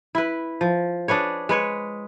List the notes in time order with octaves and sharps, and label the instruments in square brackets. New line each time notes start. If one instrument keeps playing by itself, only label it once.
[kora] E4 B4
F3
D4 G#4 B4 C#5
G#3 B4 C#5